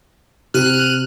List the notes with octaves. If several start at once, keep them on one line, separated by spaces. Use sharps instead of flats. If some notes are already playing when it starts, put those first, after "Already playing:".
C3 F6 F#6 D#7